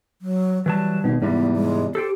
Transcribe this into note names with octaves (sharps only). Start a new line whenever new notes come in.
F#3
E3 F#3 G3 A5
G#1 B2
E2 G#2 C3 G3 B3
G#3
G4 A4 C5 G5